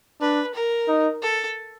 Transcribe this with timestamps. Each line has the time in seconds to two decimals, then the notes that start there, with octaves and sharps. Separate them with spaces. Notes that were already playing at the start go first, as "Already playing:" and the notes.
0.21 D4 B4
0.54 A#4
0.88 D#4
1.22 A4